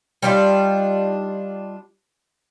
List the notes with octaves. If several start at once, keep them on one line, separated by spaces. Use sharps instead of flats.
G3 D4 D#4 F4